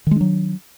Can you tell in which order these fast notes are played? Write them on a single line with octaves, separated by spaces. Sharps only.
D#3 G#3 D4 F#3